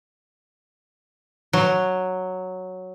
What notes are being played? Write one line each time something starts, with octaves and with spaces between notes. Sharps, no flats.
F#3